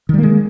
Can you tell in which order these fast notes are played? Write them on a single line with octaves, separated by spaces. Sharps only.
D#3 G3 A#3 G#3